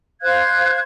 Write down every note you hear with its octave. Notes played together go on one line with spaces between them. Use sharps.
C5 F5 F#6 G#6